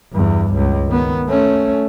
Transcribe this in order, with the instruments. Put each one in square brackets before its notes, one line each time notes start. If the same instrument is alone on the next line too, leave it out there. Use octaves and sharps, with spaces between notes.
[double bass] E2 G2
C#2
D#3 B3
A3 C#4